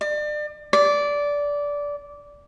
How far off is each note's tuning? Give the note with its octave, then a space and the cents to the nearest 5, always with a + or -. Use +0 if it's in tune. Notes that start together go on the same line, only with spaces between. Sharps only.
D5 +35
D5 -15